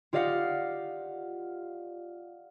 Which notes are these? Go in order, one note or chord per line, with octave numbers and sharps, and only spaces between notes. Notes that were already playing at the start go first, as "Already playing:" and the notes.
F4 G4 D5 D#5 F5 F#5